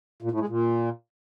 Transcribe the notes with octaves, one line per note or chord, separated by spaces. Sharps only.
A#2
A2
G#3
A#2